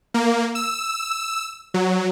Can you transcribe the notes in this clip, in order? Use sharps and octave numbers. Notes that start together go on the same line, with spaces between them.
A#3
E6
F#3